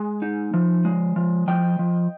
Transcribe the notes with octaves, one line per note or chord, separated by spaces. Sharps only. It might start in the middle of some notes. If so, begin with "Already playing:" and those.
Already playing: G#3 G#5
D#4
F3
G#3
F3
F3 D#5 G5
F3